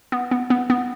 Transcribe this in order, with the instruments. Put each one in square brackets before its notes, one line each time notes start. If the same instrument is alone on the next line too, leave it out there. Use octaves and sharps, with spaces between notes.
[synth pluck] B3
B3
B3
B3